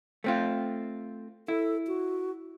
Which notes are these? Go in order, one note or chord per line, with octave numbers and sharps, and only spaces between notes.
A3 C4 F4
E4 A4
F#4